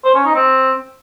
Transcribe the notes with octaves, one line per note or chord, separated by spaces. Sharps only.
C5
C#4
D#4
C4